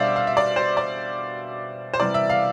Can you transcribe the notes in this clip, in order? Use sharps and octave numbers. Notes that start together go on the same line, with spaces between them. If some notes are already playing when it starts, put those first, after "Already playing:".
Already playing: B2 G3 D4 C5 D5 E5 F5
F5
E5
D5
C5
D5
C5
C3 E3 G3 B3 D5
E5
F5